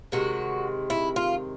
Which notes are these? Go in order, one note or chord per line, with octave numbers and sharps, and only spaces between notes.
C3 D#3 G#3 F#4
E4
F4